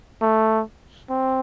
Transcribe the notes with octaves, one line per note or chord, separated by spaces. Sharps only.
A3
C4